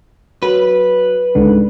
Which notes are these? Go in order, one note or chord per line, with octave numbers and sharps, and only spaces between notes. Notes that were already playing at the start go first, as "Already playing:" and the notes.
F#3 B4
C#2 G#2 D3